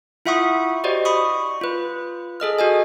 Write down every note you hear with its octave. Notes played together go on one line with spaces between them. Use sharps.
E4 F4 E5 F#5 C#6 D#6
F#4 G4 C5 D5 D#5
B5 C#6 D#6
F4 B4
G#4 A4 D#5 F6
F#4 D#5 G#5